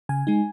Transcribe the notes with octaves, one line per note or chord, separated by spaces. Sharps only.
C#3 G#5
G#3 D#4